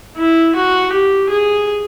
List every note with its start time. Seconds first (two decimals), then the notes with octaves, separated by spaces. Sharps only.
0.17 E4
0.55 F#4
0.92 G4
1.30 G#4